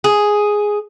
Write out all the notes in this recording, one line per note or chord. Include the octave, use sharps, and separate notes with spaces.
G#4